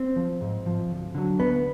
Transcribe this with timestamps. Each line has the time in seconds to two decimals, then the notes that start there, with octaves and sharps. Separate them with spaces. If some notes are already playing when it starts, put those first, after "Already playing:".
Already playing: C4
0.16 F3
0.41 G#2
0.66 F3
0.91 D2
1.15 D3 F#3
1.39 D2 B3